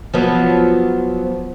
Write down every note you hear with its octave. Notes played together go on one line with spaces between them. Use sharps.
F3 F#3 B3